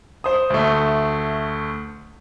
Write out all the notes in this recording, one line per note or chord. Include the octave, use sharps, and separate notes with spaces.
C5 D#6
D2 A3